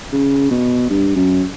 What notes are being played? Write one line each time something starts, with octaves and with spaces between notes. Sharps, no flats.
C#3
B2
G2
F#2